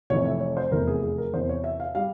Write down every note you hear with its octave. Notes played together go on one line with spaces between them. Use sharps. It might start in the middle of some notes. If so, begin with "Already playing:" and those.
F1 F2 E3 C#5
E5
C#5
C5
F1 E2 C3 E3 A#4
G#4
G#4
A#4
E2 C3 E3 C5
C#5
E5
F5
G3 F5